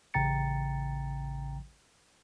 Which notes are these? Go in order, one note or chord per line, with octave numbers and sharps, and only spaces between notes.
A1 C#3 G5 A#5 A6 C#7